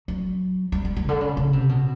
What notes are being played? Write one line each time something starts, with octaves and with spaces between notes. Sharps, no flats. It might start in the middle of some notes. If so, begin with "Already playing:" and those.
F#3
G3
G3
G3
C#3
D3
C#3
C#3
C3
B2